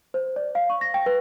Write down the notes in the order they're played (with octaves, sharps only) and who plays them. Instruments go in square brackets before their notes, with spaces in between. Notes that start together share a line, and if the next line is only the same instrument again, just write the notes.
[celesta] C5
D5
F5
C#6
A#6
G5
B4